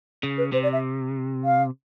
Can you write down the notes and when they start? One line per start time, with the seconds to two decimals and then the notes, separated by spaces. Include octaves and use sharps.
0.23 C#3
0.37 B4
0.52 C3 C5
0.63 D5
0.72 E5
1.44 F5